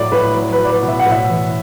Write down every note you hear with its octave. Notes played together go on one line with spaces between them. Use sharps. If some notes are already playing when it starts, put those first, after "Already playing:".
Already playing: A2 F#3 D5
A2 B4
F#3
B4
F#3
D5
B4
B2
E5
F#5
A2 E5
E3